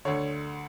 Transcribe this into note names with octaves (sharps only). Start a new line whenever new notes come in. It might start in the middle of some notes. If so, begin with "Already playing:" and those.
D2 D3 C#5